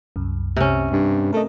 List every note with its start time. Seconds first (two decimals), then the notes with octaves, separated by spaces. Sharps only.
0.16 C2 F#2
0.56 C3 C#4
0.91 G2
1.33 A3 A#4 D#5